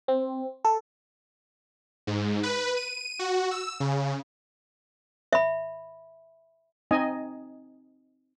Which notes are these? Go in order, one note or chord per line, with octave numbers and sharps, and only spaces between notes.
C4
A4
G#2
B4
D#7
F#4
E6
C#3
E5 B5
C4 D#4 D#5 G#5